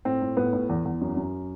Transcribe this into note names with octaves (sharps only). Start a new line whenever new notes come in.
A2 C4
A2
A2 B3
A2
E2
E2
F#2
F#2